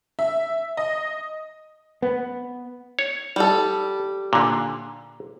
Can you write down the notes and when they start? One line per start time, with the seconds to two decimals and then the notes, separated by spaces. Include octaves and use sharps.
0.19 E5
0.77 D#5
2.02 B3
2.99 C#5
3.36 G3 A4
4.33 A#2 D3